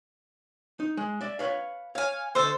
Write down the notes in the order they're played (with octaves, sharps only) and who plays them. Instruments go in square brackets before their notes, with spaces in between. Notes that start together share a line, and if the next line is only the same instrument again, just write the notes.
[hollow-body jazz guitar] D#4
G#3
D5 E5
B4 C#5 F5
[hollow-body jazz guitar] C#5 [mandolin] F5 G#5
[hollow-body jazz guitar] D2 D#5 [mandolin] A4 C5